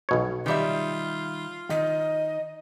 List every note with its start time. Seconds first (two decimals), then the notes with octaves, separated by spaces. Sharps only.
0.09 B1 B2 C#5
0.46 D#3 G3 F4 E5
1.70 D#3 D#5